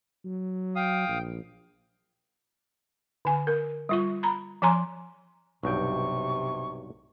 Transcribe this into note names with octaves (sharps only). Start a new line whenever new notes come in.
F#3
F5 G5 D#6
A#1
D3 G#5
A#4
G3 F4 C#6
A#5 B5
F3 C#5 G#5 A#5 C6
B1 G2 C3 G5 C#6